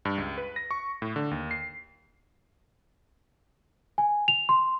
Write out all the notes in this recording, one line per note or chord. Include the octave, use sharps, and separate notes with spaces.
G2
C#2
B4
A#6
C#6
A2
D3
D#2
C7
G#5
F7
C6